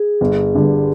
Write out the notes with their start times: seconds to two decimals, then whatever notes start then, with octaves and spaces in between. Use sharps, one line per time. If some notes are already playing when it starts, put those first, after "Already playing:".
Already playing: G#4
0.21 G1
0.55 G2 D3 G3